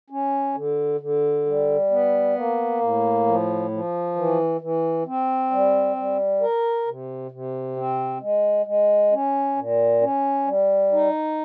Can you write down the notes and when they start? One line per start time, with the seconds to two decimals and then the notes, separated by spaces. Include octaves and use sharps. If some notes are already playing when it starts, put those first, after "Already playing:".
0.10 C#4
0.55 D3
1.01 D3
1.46 G3
1.91 B3
2.36 A#3
2.81 A2
3.26 F3
3.71 F3
4.16 E3
4.61 E3
5.06 C4
5.51 G3
5.96 G3
6.41 A#4
6.87 C3
7.31 C3
7.76 C4
8.21 G#3
8.66 G#3
9.12 C#4
9.56 A#2
10.01 C#4
10.47 G3
10.92 D#4